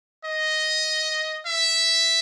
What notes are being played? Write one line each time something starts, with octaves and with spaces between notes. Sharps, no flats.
D#5
E5